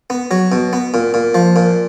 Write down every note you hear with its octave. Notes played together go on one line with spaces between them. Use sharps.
B3
F#3
B2
B3
A#2
A#2
F3
A#2